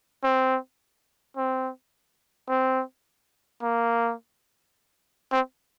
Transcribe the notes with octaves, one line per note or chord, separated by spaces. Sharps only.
C4
C4
C4
A#3
C4